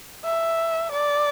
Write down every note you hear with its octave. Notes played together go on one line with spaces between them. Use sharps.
E5
D5